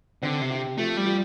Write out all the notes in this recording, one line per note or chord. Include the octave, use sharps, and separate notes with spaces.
D3 C4
C3
G4
F3 A3
G3
F3